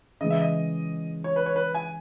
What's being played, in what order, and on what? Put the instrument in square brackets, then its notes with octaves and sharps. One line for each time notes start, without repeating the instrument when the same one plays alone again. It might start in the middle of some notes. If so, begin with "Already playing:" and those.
[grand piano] C#3 E3 G#3 [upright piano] D#5
[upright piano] E5
D#5
C#5
B4
C#5
B4
G#5